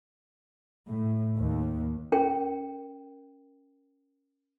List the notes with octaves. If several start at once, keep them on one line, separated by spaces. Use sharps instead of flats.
A2
D#2
C#4 A#4 G5